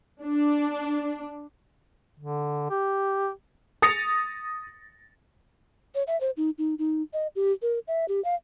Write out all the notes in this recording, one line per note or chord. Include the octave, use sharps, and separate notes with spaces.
D4
D3
G4
D#6 A6 A#6 C#7 F7
C#5
E5
C5
D#4
D#4
D#4
D#5
G4
A#4
E5
G4
F5